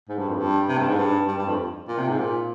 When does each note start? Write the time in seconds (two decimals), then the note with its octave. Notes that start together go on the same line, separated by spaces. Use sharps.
0.09 G#2
0.18 G2
0.28 F2
0.38 G2
0.69 C3
0.78 G2
0.88 G#2
0.98 G2
1.28 G2
1.38 G2
1.48 F2
1.88 A#2
1.98 C3
2.08 G#2
2.19 A#2